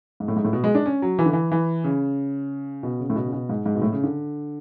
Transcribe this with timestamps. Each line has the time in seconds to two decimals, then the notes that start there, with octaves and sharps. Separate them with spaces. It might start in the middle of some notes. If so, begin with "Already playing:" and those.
0.20 G#2
0.28 A2
0.36 G#2
0.45 A2
0.53 B2
0.64 G#3
0.75 D4
0.86 C#4
1.02 F#3
1.19 E3
1.26 D3
1.33 E3
1.52 E3
1.84 C#3
2.83 B2
3.00 C#3
3.10 A2
3.16 B2
3.26 C#3
3.33 B2
3.49 G#2
3.66 G#2
3.75 B2
3.82 A2
3.93 C#3
4.03 D3